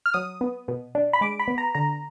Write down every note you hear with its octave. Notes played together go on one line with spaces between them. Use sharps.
F6
F#3 D#6
B3
B2
D4
B5
G#3 D6
B5
B3
A#5
D3 A#5